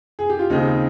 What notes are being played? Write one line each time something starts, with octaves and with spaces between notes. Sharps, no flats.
G#4
G4
F4
D#2 C#3 C4 D#4